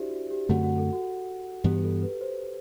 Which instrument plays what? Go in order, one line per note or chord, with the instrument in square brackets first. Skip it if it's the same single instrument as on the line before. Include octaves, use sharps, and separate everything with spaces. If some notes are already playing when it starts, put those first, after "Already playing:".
Already playing: [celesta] D4 E4 F#4 G4 C5 D5 E5
F#4
G4
[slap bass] F#2 D3 A3 C4 [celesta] F#4 F#5
[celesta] F#4 F#5
A4
F#4
[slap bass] G2 E3 B3 [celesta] G4
[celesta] A4
B4
C5